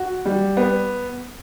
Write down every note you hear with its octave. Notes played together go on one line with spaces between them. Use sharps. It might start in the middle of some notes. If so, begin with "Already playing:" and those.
Already playing: F#4
G3
B3